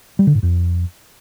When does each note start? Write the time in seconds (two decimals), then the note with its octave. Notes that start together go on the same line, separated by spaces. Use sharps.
0.19 G3
0.27 D3
0.35 G#2
0.43 F2